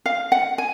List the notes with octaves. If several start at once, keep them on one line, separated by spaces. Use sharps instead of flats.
F5
F#5
G#5